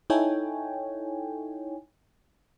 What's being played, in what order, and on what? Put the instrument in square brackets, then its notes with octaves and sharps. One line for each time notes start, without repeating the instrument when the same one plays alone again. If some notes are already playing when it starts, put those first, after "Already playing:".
[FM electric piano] D#4 E4 A4 C#5 G5 G#5